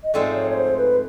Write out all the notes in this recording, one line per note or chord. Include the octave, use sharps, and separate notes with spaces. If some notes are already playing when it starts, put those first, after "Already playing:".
D#5
G#2 F3 A3 C4 D#4 D5
C#5
C#5
C5
B4